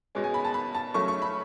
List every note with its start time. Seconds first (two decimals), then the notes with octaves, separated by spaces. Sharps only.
0.15 B2 G#3 C#4
0.24 G#5
0.34 B5
0.44 A5
0.54 B5
0.75 A5
0.94 C#3 F#3 A3 C#4 C#6
1.08 C#6
1.22 B5